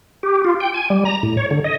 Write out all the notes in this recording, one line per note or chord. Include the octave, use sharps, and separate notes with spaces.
G4
F4
G5
G#5
G3
A#5
A2
C#5
D3
D#5